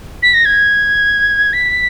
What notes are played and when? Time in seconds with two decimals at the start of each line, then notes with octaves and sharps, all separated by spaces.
0.23 B6
0.34 A#6
0.45 G#6
1.53 B6